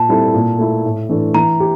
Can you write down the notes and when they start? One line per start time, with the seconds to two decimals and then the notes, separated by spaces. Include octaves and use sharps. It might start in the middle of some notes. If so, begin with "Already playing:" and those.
Already playing: A#2 A5
0.09 G3 C4 E4 A4
0.34 A#2
0.58 A3 E4
0.85 A2
1.09 E3 A3 D4
1.34 E3 A#5
1.60 G4